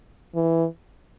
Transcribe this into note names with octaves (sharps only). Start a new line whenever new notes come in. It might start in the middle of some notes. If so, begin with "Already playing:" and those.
E3